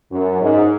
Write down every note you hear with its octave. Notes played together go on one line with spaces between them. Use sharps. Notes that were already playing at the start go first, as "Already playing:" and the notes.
F#2
G#2